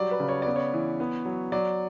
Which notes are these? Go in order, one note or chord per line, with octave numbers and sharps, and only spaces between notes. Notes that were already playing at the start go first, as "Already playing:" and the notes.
Already playing: F#3 G3 D5
B4
C#3
C#5
B3 D5
C#5
E3
B3
F#3
F#3 D5